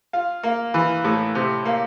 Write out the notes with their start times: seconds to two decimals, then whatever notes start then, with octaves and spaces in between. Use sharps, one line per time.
0.13 F4
0.43 A#3
0.74 E3
1.04 A2
1.35 C3
1.65 A#3